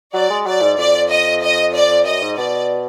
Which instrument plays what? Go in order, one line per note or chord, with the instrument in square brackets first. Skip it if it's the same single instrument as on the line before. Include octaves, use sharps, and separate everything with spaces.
[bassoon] F#3 [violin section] D5
[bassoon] G#3
[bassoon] F#3 [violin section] D5
[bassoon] G#2
[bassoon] F2 [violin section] D5
[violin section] D#5
D#5
D5
[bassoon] F#2 [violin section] D#5
[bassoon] G#2
[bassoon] B2 [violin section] D5